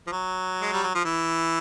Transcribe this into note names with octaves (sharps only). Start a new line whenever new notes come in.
F3
F#3
G#3
G3
F#3
F3
E3